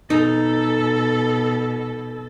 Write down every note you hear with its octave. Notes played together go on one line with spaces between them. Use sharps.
B2 D#4 A4